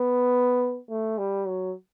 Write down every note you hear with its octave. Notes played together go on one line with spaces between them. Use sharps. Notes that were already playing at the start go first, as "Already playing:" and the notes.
Already playing: B3
A3
G3
F#3